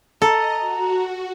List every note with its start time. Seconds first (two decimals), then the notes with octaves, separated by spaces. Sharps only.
0.22 A4 D#5 A#5
0.59 F#4